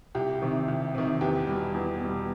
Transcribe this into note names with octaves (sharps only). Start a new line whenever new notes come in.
C2 G4
C3 D#3
C2
C3 D#3
E2 G4
B2 G3
E2
B2 G3